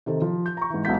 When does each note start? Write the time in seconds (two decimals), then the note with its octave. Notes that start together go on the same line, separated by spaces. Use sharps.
0.06 C3 D#3 A4 C5
0.22 F3
0.46 G6
0.57 A#5 C#6
0.70 G#2 E3
0.85 B1 G#2 B2 F#5 G6 B6